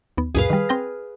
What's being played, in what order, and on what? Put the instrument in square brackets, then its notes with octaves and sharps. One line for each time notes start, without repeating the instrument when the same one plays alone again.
[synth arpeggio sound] D#2 B3
[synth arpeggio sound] C#2 F#2 A#2 [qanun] G#4 B4 F5
[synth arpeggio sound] D#3 G3
C4 G5 A#6